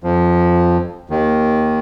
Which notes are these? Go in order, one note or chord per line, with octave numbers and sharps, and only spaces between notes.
F2 F3
D#2 D#3